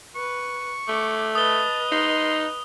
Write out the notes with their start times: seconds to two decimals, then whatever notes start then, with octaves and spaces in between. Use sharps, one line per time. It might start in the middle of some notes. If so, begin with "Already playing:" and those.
0.15 B4 C#6
0.88 A3 D6
1.35 B4 D#5 A5 D#6 G7
1.92 D#4 C6